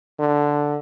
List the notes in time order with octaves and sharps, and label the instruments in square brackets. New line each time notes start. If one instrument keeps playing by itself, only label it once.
[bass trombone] D3